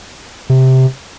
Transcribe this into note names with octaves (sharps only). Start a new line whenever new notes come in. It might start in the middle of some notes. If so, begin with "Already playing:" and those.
C3